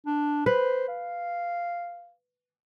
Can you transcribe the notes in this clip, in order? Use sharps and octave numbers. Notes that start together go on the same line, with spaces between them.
D4
B4 C5
F5